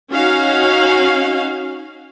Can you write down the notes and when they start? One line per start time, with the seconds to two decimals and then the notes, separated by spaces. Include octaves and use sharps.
0.11 C#4 D#4 F#4 F5